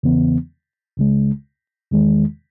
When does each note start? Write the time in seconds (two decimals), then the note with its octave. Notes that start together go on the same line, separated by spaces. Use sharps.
0.03 E2 C#3 E3 B3
0.97 C#2 C#3 G#3
1.91 E2 D#3 G#3